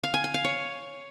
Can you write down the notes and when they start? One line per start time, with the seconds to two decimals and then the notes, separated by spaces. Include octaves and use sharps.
0.04 F5
0.14 G#5
0.24 G#5
0.34 F5
0.44 C#5